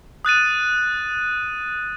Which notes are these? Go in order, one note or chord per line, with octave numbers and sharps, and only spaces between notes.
D#6 F#6 A6 D#7